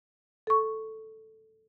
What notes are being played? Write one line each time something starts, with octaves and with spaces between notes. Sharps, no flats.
A4 C#6